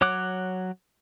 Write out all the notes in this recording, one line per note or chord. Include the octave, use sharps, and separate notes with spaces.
F#3 C#5 F#5 D6 F#6